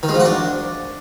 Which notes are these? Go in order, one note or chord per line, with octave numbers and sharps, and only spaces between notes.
D#3
G#3
F3
F#4
D4